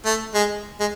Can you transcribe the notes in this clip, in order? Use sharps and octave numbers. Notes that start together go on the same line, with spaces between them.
A3
G#3
G#3